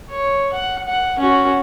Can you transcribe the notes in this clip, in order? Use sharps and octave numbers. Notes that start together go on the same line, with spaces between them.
C#5
F#5
F#5
C#4 F#4